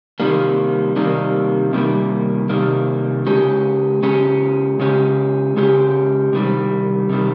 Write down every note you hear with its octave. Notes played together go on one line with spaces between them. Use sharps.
C3 D#3 G3 A#3
C3 D#3 G3 A#3
C3 D#3 G3 A#3
C3 D#3 G3 A#3
C#3 G#3 C#4 G4
C#3 G#3 C#4 G4
C#3 G#3 C#4 G4
C#3 G#3 C#4 G4
C3 D#3 G3
C3 D#3 G3